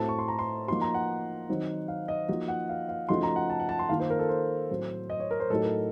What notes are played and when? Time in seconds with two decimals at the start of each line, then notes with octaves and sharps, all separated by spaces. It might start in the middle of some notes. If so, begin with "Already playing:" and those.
Already playing: A2 A3 C4 F#4 A5
0.09 C#6
0.19 C6
0.28 A#5
0.39 C6
0.68 F3 A#3 D#4 F#4 C6
0.81 A#5
0.94 F#5
1.49 D#3 F#3 C4 D#4 F#4
1.88 F5
2.08 D#5
2.28 F3 A#3 D#4 F#4 D#5
2.48 F#5
2.69 F5
2.89 F5
3.09 C#3 F3 A3 D#4 F#4 C6
3.23 A#5
3.36 F#5
3.50 A5
3.60 F#5
3.69 A5
3.79 C6
3.89 D#3 A#3 F4 F5
4.00 C5
4.10 A#4
4.19 A4
4.29 C5
4.70 A2 F#3 C4 F#4
5.10 D#5
5.20 C#5
5.31 A#4
5.40 C5
5.50 A2 F#3 A3 D#4 F#4 A4
5.64 A#4